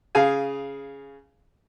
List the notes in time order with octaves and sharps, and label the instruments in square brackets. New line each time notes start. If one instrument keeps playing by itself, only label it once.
[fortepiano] C#3 G#4 F5 G#5